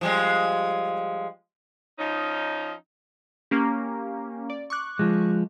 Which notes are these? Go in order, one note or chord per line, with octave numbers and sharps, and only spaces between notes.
F3 G3 G#3
F3 C#4 D#4
A#3 C#4 G4
D5
C#6 D6 F#6
F3 G#3